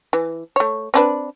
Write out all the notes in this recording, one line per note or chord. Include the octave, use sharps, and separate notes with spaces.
E3
A3 C#5
C4 D4 B4